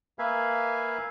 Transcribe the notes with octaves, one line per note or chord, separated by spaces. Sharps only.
A#3 B4 E5 F5 G#5